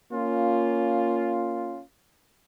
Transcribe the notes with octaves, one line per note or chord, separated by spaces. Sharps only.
A#3 C#4 F4